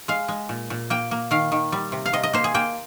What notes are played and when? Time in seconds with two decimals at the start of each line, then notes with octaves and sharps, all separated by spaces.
0.08 G#3 F5
0.28 G#3
0.49 A#2
0.70 A#2
0.90 A#3 G5
1.11 A#3
1.31 D#3 F5
1.52 D#3
1.72 G3
1.92 C3
2.06 F5
2.13 C3 D#5
2.23 D#5
2.33 A#3 C5
2.44 G#4
2.54 A#3 G5